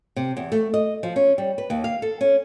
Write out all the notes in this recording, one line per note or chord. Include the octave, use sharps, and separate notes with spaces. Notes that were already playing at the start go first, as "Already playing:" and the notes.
C3
E2
A3
D#5
F3
C#4
G3
B4
D#2
F5
A4
C#4